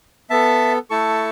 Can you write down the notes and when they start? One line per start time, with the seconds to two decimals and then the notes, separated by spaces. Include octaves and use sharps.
0.30 B3 A4 E5 A5
0.90 A3 E4 A4 A5 C#6